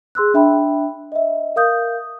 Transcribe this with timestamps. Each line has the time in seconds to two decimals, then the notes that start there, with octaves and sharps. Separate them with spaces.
0.15 G#4 C6 E6 F#6
0.34 D4 E5 G5 B5
1.12 D#5 E5
1.56 A#4 F5 D#6 G6